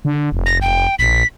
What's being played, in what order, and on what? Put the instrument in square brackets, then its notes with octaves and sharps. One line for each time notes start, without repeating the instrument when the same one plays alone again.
[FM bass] D3
F1
[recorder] A#6
[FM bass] F1 [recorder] G5
[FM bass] A#1 [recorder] B6